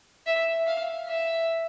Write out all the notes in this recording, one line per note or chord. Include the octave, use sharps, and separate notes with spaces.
E5
F5
E5